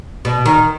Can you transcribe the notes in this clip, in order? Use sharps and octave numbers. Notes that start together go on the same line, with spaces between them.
B2
D#3